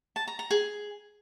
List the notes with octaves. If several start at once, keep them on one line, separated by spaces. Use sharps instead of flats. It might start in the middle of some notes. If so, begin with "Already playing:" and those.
A5
A#5
A#5
G#4